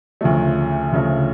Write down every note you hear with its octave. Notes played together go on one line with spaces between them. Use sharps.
D2 C#3 F3 A3
D2 C#3 F3 A3